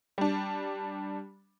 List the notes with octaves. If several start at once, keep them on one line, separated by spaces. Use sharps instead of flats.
G3 D4